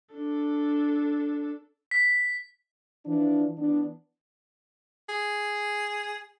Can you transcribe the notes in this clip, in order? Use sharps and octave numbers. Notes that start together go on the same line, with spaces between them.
D4 A4
B6
E3 F3 D4
E3 B3 D4
G#4